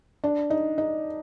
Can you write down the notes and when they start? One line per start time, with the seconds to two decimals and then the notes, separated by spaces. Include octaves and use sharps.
0.24 D4
0.50 D#4
0.78 D#4